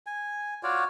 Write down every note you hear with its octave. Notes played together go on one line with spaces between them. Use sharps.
G#5
F4 F#4 C#5 D5